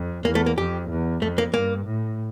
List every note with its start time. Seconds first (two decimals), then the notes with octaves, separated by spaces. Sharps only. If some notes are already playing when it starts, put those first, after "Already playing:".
Already playing: F2
0.24 E2 A#3
0.35 A3
0.46 A#3
0.58 F2 G4
0.90 E2
1.22 F2 A3
1.38 A#3
1.54 G2 A#3
1.86 A2